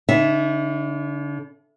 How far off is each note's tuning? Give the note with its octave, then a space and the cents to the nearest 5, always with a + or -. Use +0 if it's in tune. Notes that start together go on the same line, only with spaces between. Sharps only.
D3 -40 D#4 +0 E5 +0